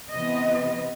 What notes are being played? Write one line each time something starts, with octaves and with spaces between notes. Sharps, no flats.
C3 E3 B3 D#5